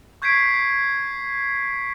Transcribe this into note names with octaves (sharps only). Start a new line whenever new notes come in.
C#6 G6 G#6 B6 C7 D7